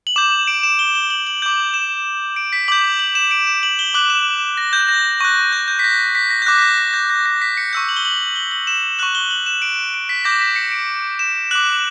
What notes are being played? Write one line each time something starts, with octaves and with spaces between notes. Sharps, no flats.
F#7
D6 G6 E7
D7
E7
G7
G7
F#7
F#7
D6 G6
E7
D7
B6
D6 G6 F#7
F#7
E7
D7
E7
F#7
G7
D6 F#6 F#7
E7
A#6
G6
A#6
C#6 F#6 A#6
G6
G6
B6
A#6
B6
A#6
G6
D6 F#6 A#6
B6
A#6
A#6
G6
A#6
A#6
B6
C#7
C#6 E6 G6
F#7
G7
F#7
G7
F#7
E7
C#6 F#6 F#7
G7
F#7
E7
D7
D7
B6
D6 G6 A#6
B6
C#7
D7
E7
D6 F#6 F#7